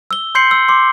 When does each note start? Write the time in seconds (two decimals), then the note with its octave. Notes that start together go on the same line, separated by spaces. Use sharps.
0.11 E6 G7
0.35 C6 G6 C7 C#7 F#7
0.51 E6
0.69 C6 D6